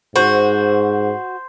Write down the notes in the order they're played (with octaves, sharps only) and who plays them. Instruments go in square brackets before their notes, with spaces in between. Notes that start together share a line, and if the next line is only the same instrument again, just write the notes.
[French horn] G#2 [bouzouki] F#4 [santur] C5